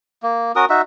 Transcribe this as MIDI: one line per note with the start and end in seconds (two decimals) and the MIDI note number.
0.23 0.52 58
0.56 0.65 61
0.56 0.65 66
0.56 0.65 70
0.56 0.65 87
0.70 0.82 63
0.70 0.82 66
0.70 0.82 76